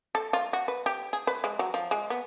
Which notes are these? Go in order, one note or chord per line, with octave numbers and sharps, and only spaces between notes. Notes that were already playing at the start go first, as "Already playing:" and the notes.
A4
F4
F#4
B4
G4
G#4
B4
G#3
F#3
F3
G#3
B3